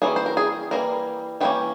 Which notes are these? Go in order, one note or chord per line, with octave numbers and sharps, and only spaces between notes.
E3 G3 A#3 C#4 G#4
C5
A#4
G#4
E3 G3 A#3 A#4
E3 G3 A#3 C#4 G4